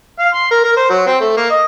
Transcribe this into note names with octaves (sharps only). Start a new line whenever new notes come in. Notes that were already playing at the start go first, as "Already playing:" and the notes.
F5
C6
A#4
A#4
C5
F#3
C4
A3
A#3
D#5